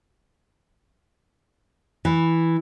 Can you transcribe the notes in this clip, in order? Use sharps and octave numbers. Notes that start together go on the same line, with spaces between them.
E3